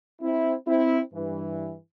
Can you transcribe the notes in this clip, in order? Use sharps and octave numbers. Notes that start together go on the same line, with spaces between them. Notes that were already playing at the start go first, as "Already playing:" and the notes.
C4 E4
C4 E4
G2 E3